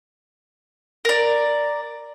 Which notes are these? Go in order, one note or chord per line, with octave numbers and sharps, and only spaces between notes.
A#4 D5